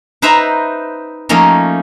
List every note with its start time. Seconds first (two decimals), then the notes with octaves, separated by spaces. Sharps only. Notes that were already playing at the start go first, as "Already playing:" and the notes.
0.22 D#4 B4 C5 E5 A#5
1.29 F3 A3 A#3 C#4 D#4